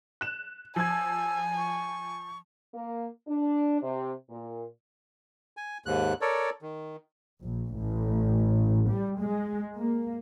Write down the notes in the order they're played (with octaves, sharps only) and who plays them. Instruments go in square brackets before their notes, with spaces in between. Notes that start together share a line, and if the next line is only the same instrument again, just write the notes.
[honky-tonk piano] F#6 E7
[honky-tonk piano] F3 G#6 [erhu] G#5 [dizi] E6
[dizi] C#6
[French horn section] A#3
D4
C3
A#2
[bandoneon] G#5
D#2 G#2 F#6
A4 A#4 C#5 D5
D#3
[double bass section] A#1
A1
G3
G#3
A#3